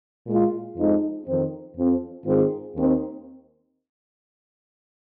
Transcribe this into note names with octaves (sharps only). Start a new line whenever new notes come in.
A#2 G#3 F4
F2 F3 G#3 D#4
F2 D#3 C4
F2 F3 C4
G#2 D#3 C4 F4 G#4
D#2 D#3 C4